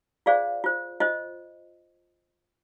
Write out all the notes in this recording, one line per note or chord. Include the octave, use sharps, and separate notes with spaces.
F4 G#4 C5 D5 F5
F4 C5
F4 C5 D#5